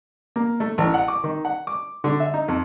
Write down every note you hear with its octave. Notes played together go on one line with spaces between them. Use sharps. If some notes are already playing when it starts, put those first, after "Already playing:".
A#3
A3
A1
F#5
D6
D#3
F#5
D6
D3
E5
D#4
F2